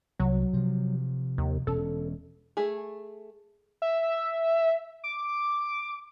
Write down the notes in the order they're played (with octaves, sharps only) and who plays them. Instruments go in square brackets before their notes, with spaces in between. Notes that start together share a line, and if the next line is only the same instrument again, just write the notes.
[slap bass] C2 [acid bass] F#3
[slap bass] C3 F3
[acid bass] D#2
[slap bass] E1 C#4 [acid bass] A4
[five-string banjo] A3 G#4
[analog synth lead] E5
D6